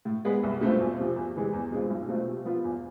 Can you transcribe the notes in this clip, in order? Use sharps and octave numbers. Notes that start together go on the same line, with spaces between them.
A2
G#3 B3
C2
B2 A3 C4 F4
E2
C3 F3
E2
C3 E3 G#3
E2
B2 G#3 C4 F4
B1
B2 A3 C4 F4
C3
F3 B3 F4
E2